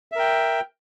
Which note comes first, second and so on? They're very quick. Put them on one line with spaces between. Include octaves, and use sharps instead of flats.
E5 A#4 G5